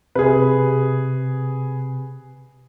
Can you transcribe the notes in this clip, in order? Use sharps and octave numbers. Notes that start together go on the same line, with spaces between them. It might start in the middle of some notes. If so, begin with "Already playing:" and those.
C3 G#4 B4